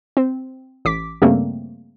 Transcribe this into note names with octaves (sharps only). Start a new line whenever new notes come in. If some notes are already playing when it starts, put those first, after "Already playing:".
C4
A1 D6 B6
G2 C#3 G3 A3 A#3 C4